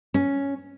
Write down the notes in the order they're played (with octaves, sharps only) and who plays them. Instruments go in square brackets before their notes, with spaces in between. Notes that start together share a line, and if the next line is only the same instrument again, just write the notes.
[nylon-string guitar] C#4